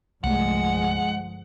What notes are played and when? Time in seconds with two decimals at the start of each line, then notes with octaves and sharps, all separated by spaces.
0.24 G1 C2 F3 G#3 A3 F#5